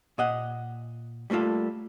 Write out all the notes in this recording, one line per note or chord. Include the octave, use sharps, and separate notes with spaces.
A#2 D#5 F#5
G3 A3 A#3 F4 A4